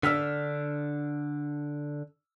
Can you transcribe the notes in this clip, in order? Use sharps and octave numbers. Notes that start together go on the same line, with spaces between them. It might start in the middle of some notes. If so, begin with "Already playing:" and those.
D3 D4 E6 F6 B6